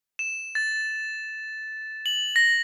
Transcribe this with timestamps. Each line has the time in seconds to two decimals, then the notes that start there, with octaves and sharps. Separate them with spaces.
0.19 E7
0.55 A6
2.06 F#7
2.36 A#6